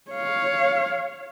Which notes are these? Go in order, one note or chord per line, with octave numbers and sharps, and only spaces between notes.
C#5 F5